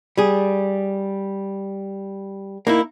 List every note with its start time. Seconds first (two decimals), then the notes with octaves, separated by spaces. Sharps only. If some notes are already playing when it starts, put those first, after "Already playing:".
0.17 G3 G#4
2.67 A#3 D#4 E4